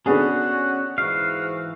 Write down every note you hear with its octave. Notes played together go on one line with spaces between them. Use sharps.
D3 B3 C#4 D4 F#4 G#4
G#2 E3 F#4 F5